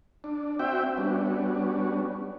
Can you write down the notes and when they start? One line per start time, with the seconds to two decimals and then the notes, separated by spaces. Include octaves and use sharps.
0.24 D4
0.59 C4 F#4 E5 G5
0.97 G3 B3 C#4 D4 F#4